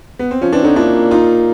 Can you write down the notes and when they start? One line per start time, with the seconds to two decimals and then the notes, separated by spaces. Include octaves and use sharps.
0.19 B3
0.31 C4
0.42 F3 C#4
0.53 E3 C4 D4
0.64 D3 C#4 D#4
0.76 A#2 D4 E4
1.11 D#4 F4